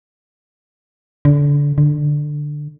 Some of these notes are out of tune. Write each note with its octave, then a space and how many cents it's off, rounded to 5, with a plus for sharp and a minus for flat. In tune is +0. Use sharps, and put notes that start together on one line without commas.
D3 -25
D3 +10